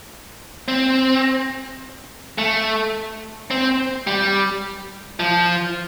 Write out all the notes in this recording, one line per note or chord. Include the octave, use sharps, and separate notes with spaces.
C4
A3
C4
G3
F3